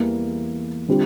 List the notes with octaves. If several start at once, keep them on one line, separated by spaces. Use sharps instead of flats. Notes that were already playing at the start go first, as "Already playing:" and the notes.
Already playing: E2 E3 G3 A#3
D3 G3 C4 F4